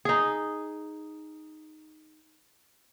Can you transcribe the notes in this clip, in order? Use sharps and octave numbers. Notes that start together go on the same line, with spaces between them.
D#4 G#4